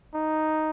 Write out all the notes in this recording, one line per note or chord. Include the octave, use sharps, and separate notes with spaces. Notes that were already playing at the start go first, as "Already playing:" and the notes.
D#4